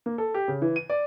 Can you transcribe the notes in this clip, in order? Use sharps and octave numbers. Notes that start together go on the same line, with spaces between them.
A#3
A4
G4
C#3
E3
D#7
D5